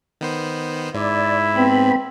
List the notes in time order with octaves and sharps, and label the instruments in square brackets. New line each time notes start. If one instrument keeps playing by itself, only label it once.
[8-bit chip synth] D#3 B3 C5
[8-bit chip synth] G#2 [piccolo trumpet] E4 [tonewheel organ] D5
[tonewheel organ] B3 B5 [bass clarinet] C4